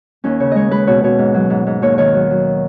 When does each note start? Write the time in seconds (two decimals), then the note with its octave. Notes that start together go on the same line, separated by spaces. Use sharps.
0.24 D#2 C#4
0.40 C#3 C#5
0.52 G#3 C#5 D#5
0.71 G#3 B4
0.87 B2 C#5
1.03 B2 C#5
1.19 G#2
1.34 F#3
1.50 G#2
1.67 G#2
1.82 D#2 C#5
1.98 D#3 C#5
2.14 F#3
2.30 F#3